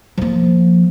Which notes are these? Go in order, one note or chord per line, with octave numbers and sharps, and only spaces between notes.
F3 A#3